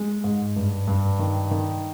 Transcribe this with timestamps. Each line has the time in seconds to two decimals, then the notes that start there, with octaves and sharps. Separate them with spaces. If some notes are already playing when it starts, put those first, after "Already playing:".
Already playing: G#3
0.24 G#2
0.56 G2
0.87 G2
1.19 D#3
1.51 D#3